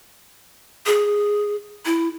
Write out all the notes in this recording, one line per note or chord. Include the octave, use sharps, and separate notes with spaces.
G#4
E4